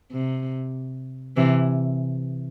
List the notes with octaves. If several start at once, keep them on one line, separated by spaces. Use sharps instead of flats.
C3
C3 E3